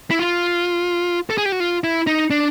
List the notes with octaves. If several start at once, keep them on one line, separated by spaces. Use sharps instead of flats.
E4
F4
A4
G#4
G4
F#4
F4
E4
D#4
D4